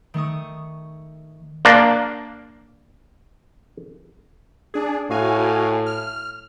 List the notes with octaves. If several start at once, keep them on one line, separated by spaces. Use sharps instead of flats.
D#3 A3 C#6 D#6
A#3 D4
D4 G#4
A2 F#4 F5 G#5
F6